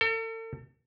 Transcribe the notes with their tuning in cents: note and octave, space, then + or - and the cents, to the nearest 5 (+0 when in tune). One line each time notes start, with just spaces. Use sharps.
A4 +40